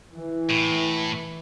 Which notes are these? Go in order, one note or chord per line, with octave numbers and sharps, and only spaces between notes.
E3
A2